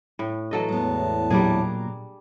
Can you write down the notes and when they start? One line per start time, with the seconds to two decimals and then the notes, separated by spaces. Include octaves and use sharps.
0.19 A2
0.51 E3 F#3 A4 D#5
0.69 E2 A2 G#3 B3 A5
1.30 A#2 F#3 G3 A#3 D4 G#4 A#4